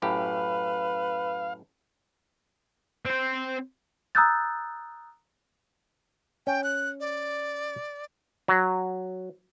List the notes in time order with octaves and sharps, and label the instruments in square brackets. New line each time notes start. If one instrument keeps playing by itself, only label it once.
[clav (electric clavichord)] F#2 A2 G4 [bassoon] B4 [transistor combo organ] F5
[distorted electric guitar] C4 C5
[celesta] A#5 D#6 E6 F#6 G6 A6
[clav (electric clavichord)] C#4 [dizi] G5
[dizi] F#6
D5
[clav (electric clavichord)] F#3